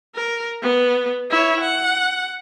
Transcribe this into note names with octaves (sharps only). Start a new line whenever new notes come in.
A#4
B3
E4 C#5
F#5